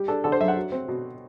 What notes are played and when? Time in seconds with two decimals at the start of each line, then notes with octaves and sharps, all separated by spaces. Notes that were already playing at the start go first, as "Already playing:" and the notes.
Already playing: G3 G4
0.08 D4 A4
0.24 D3 A4
0.32 C5
0.40 F#2 E5
0.48 F#5
0.57 F#3
0.72 C4
0.88 B2